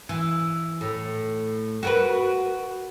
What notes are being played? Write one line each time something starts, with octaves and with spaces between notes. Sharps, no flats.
E3
A2
F#4 A#4 B4